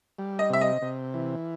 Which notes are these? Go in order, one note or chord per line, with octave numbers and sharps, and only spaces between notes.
G3
D#5
C3 E5
D#5
C3
E3